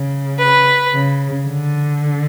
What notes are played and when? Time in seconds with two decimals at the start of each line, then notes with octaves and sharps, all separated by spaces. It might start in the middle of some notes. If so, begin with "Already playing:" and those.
Already playing: C#3
0.38 B4
0.94 C#3
1.47 D3